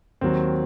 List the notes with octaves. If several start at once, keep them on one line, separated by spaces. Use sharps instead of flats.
D#2 D#3 F#3 C4